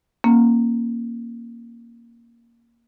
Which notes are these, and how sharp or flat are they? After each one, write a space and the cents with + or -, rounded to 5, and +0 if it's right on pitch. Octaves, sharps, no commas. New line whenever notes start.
A#3 +0 C#4 -25